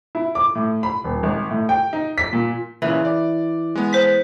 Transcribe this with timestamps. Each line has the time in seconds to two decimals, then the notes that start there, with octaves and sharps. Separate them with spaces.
0.15 E4
0.35 D6
0.55 A2
0.83 B5
1.04 D#1
1.23 G#1
1.50 A2
1.69 G5
1.93 D#4
2.18 B6
2.33 A#2
2.82 A#2 C#3 E3
3.05 D5
3.75 G#3 B3
3.93 C5 B6